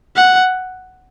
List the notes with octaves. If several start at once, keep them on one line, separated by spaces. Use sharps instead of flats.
F#5